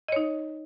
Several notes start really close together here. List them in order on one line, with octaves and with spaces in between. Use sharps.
D#5 C#5 D#4